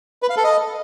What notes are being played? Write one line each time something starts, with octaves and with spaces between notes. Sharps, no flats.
B4
F5
A4
D#5